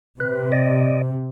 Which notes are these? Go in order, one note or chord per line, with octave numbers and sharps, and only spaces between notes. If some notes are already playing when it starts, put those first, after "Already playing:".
C3 B4
D5 D#5